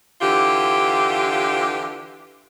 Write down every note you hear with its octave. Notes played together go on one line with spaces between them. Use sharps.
D3 E3 F4 G4